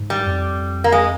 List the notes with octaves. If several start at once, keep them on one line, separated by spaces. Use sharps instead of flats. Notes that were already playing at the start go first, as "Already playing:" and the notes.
Already playing: G#2
G3
F2
A#3
G#3